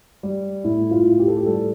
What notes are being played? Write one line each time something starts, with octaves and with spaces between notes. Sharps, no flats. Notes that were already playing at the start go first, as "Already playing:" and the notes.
G3
A2 E4
F4
A2
G4
A4
G4
G3 A4